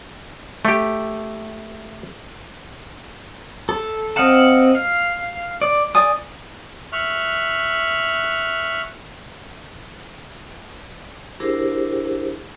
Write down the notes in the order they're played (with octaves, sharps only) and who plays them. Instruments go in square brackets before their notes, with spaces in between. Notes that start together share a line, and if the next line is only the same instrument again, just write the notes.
[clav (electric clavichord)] A3 G4
[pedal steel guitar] A4
C4 D#5 F5 F#5 A5
F5
D5
D5 G#5 D#6
[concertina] E5 C#6 F6 F#6
[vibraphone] D4 E4 G4 G#4 A#4 C5